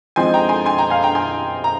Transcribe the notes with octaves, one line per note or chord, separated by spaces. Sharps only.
F3 G#3 C4 D#4 G#5 C6
G5 A#5
G#5 C6
G#5 C6
G5 A#5
F5 G#5
G5 A#5
G#5 C6
A#5